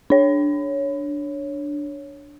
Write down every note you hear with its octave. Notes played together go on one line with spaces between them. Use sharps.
D4 C#5